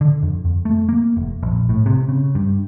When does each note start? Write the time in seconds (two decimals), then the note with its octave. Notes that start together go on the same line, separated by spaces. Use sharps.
0.01 D3
0.23 F2
0.45 F2
0.65 A3
0.89 A#3
1.17 F1
1.43 A#1
1.69 A2
1.86 C3
2.09 C#3
2.35 G2